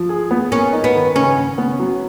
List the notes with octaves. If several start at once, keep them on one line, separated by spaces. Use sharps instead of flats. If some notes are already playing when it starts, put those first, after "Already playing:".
Already playing: F3
G#4
B3
A#3 C#4
D#4
B3
D#3
C#3 C#4
C#3
B3
F#3